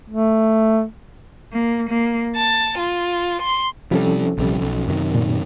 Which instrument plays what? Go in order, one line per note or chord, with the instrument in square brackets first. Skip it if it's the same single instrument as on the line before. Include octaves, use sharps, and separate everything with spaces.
[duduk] A3
[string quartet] A#3
A#3
A5
F4
C6
[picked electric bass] C3 G3 [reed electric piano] F3 C#4 A4
[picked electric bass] A#1 C3 G3
B1
F#2 C3 D#3
[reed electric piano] A#2